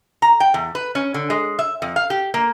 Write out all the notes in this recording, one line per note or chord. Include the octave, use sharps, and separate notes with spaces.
A#5
G5
E2
B4
C#4
D3
G#3
E5
F2
F5
G4
A#3